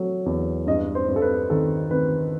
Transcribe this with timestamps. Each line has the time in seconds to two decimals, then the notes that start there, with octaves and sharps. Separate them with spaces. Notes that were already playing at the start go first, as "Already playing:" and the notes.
Already playing: F#3 A3
0.26 E2
0.67 G2 D#5
0.95 C5
1.08 G2
1.16 A4
1.22 B4
1.50 D#3 A4
1.91 D#3 B4